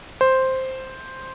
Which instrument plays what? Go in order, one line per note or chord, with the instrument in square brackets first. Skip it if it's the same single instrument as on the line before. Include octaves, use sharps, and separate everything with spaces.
[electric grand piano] C5